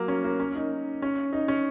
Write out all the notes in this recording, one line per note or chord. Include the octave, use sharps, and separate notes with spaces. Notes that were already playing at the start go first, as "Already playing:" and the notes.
Already playing: F#3 A#3
C#4
A#3
C#4
D#4
C#4
D#4
C#4